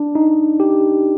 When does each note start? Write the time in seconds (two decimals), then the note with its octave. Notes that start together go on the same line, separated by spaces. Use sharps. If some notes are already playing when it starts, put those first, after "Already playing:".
Already playing: D4
0.15 D#4
0.60 G4